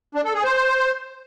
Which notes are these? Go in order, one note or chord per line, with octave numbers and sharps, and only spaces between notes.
D4
A4
G#4
C5